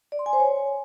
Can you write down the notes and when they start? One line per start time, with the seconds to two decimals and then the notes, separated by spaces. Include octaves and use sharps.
0.12 D5
0.19 C6
0.26 G#5
0.33 C5
0.40 C#5